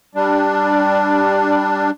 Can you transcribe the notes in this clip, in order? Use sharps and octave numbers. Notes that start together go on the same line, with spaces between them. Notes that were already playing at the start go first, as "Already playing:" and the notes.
G3 D4